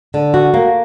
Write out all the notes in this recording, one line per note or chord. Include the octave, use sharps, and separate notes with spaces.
D3
F#4
A#3